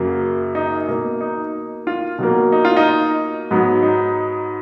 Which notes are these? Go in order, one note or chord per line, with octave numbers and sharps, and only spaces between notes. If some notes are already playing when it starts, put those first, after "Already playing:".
Already playing: F#2 C#3 F#3 A#3
D#4
B2 A#3
D#4
F4
B2 F#3 A#3
D#4
F4
D#4
G#2 F#3 B3
D#4